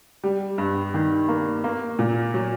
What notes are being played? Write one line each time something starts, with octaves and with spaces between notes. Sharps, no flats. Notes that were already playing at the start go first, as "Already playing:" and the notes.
G3
G2
D#3
A#3
A#3
A#2
F#3